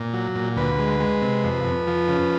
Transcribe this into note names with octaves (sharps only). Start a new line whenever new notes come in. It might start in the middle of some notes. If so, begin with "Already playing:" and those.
Already playing: A#2
F#3
A#2
D2 B4
G#3
G#3
C3
F2
F2
F3
C#3